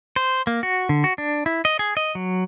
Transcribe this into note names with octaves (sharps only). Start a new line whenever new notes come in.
C5
A#3
F#4
D3
F#4
D4
E4
D#5
G#4
D#5
F#3